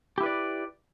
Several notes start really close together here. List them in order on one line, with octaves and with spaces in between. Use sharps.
G4 E4 B4 D5